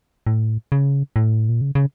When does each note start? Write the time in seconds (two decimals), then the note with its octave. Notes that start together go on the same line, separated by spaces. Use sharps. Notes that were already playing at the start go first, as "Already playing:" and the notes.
0.27 A2
0.72 C#3
1.16 A2
1.49 A#2
1.61 C#3
1.75 C#3